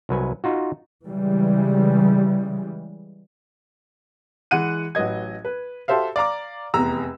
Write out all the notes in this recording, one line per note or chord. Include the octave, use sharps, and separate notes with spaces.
C2 F#3 B4 G#5
D#4 F4 F#4
C#3 E3 G3 G#3
E3 G#3 F#5 F#6 D#7
A1 F#3 B4 D#5 G#6
B4
F#4 G4 A4 C5 E5 F5
D5 F5 A#5 D6
F1 E2 A#5 E6